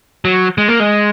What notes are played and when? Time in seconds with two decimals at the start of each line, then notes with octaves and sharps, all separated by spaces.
0.25 F#3
0.58 G#3
0.68 A#3
0.80 G#3